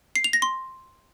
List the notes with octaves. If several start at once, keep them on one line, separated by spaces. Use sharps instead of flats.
C7
F7
A#6
C6